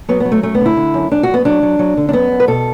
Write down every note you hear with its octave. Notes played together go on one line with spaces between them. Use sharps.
F#3 B3
F#3 B3
A3
F#2 A3
B3
D3
E4
D3
F#2
F#2 D4
F#2 F#4
B3
F#3 D4
F#3
F#3
D3
D4
F#2 B3
F#2
B4
B2 A4